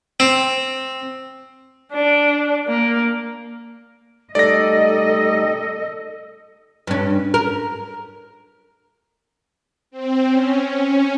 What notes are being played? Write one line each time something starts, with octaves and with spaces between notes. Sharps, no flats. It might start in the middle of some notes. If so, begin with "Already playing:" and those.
C4
D4
A#3
G3 A3 D#4 A4 D5 D#5 A#6
G2 C#4
A#4
C4
C#4
C#4